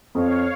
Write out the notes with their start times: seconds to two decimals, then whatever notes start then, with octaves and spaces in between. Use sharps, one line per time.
0.15 F2 C#5 F5